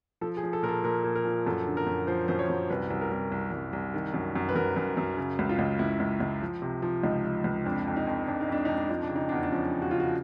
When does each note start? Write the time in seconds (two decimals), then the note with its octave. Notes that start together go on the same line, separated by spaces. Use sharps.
0.21 F3 A4
0.37 G#4
0.43 F3
0.53 A4
0.63 A#2 A#4
0.69 A4
0.84 A#2 A#4
1.04 A#2
1.16 A#4
1.25 F3
1.46 F#2 A4
1.66 D3
1.77 A#4
1.87 F#2
2.07 F3 C5
2.28 F#2 C5
2.39 C#5
2.49 F#2
2.70 C2 B4
2.90 C2
3.01 A#4
3.11 C2
3.32 C2
3.52 C2
3.73 C2
3.94 D#3
4.14 F#2
4.36 F#2
4.49 B4
4.55 F#2 A#4
4.76 F#2
4.97 F#2
5.17 C#3
5.39 C#2
5.49 F4
5.59 C#2
5.79 C#2 E4
6.00 C#2
6.20 C#2
6.42 F3
6.62 C3
6.82 F3
7.03 C#2 D#4
7.24 F3
7.44 C#2
7.65 F2 D4
7.87 F2
7.96 D#4
8.07 F2
8.27 F2 D4
8.41 D#4
8.48 F2 D4
8.65 F2 D#4
8.78 D4
8.89 F3 D#4
9.03 D4
9.10 C#3
9.16 D#4
9.29 E2 D4
9.43 D4
9.52 F3 C#4
9.72 C#3
9.82 F#4
9.91 C#3 F4
10.00 F#4